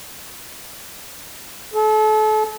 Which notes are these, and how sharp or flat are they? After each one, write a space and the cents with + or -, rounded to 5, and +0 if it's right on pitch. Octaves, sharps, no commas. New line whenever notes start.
A4 -35